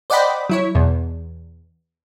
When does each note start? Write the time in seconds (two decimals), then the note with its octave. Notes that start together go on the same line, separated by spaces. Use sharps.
0.10 C5 D5 D#5 F#5 G5 B5
0.50 F#3 E4 C#5
0.75 E2 B2